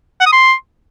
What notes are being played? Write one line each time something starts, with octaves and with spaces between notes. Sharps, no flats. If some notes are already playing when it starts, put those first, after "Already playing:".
F#5
D#6
C6